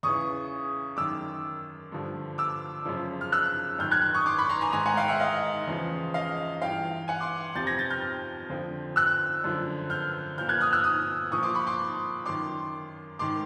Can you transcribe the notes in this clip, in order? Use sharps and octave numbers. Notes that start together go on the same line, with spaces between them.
E2 C#3 E3 C#6 D#6
F#2 D#3 D6 E6
G2 D3 F3
D6 E6
F#2 C#3 F3
F6
E6 F#6
F#2 D#3 F6 G6
F#6 G#6
C#6 D#6
C6 D6
B5 C#6
A#5 C6
G#5 A#5
G#2 D#3 G#5 A#5
F#5 G#5
F5 G5
E5 F#5
D#5 F5
E2 C#3 F3
D#5 F5
G2 E3 F5 G5
F#5 G#5
C6 D6
F2 C3 F3 G6 A6
G#6 A#6
G6 A6
F6 G6
F2 D3 F3
E6 F#6
F#2 D3 F3
F6 G6
A#2 F3 F6 G6
F#6 G#6
D#6 F6
E6 F#6
D#6 F6
A#2 F3 C#6 D#6
C6 D6
B5 C#6
C6 D6
F#2 D#3 C6 D6
G#2 D#3 C6 D6